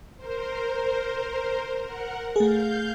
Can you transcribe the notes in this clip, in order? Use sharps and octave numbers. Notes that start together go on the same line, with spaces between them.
A#4 C5
A#4 F#5
A3 G#4 F5 G6